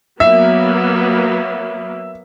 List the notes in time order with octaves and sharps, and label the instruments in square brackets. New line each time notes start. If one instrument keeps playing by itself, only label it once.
[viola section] F#3 A#3 B3 [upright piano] E5